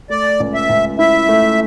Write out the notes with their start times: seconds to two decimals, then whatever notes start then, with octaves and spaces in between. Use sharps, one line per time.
0.10 A3 D5
0.40 C#2
0.54 E5
0.69 C#2
0.98 E4 E5
1.28 A3